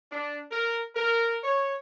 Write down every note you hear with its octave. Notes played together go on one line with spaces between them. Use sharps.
D4
A#4
A#4
C#5